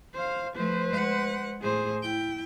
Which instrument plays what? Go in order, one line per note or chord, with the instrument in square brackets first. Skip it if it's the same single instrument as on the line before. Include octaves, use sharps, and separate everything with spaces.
[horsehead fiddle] C5 F5
[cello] F3 A3 [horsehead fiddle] B4 C5
[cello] G#3 F#5
[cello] A2 [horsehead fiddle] G#4 C5
[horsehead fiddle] E4 [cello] G5